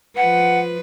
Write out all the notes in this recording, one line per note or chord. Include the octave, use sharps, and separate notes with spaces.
F3 B4 F#5